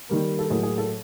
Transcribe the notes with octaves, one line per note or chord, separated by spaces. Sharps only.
D#3 G3 A#3
A4
A2 F#3 A#3 G#4
G#4
A4